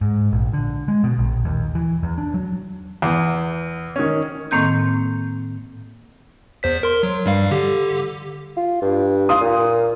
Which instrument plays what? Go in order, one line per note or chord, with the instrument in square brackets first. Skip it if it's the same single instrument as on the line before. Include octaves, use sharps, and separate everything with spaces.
[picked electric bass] G#2
A#1
D3
G#3
B2
A#1
D#2
E3
E2
D4
F#3
[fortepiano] E2
D#3 C#4
[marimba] A2 D#3 A#3 C4 G6
[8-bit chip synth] E2 C5 B6
A#4 C6
F#3
G2 G3 F5
D3 G4
[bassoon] F4
G2
[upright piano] F5 C6 D#6
[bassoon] A#2